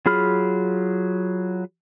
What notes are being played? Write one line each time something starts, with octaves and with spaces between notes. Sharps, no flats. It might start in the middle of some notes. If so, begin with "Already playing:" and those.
F#3 F4 G#4 B5 F6